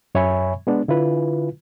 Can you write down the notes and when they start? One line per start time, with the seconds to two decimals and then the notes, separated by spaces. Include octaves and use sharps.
0.15 F#2 C#5 E5 G#5 B5 C#6
0.67 G#3 B3 D4
0.88 D3 E4 F4 B4